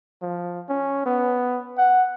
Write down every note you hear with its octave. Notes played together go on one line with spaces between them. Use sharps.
F3
C#4
B3
F#5